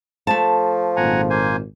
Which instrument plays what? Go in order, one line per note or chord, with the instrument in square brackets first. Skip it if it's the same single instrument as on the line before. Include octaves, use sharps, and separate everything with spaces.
[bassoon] F3 [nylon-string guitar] A3 A5
[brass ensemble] G#1 A#2 [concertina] F#5 G#5 A#5
[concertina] A#3 C5 G#5